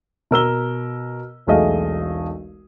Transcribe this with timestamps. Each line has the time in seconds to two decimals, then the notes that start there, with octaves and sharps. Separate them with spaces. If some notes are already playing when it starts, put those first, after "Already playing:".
0.31 B2 A#4 E6 G7
1.47 E1 B1 A3 G#4 D#5 F5